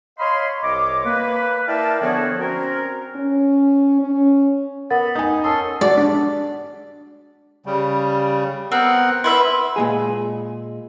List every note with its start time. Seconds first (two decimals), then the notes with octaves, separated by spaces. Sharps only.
0.18 C#5 D#5 F5 B5 C6
0.62 C2 C#5 D#5 D6
1.04 A#3 B4
1.66 E4 A#4 D5 F5 G5 A5
2.01 D3 F3 B3 F#4 G#4 C#5
2.39 C4 C#4 F#4 A#4
3.16 C#4
4.01 C#4
4.91 B3 A#4 F#5 B5 A6
5.15 D#4 G#5
5.44 C#4 A4 C6 D#6
5.81 G#3 F#4 D5
5.97 D4
7.66 C#3 G3
8.72 B3 C4 A#4 F#5
9.24 E4 B4 E5 C6
9.76 A#2 G#3 G#4